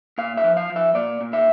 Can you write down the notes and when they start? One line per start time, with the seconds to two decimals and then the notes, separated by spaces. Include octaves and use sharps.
0.18 A#2 F5
0.37 E5
0.44 F3
0.57 F5
0.70 F3
0.76 E5
0.95 A#2 D5
1.21 A#2
1.33 E5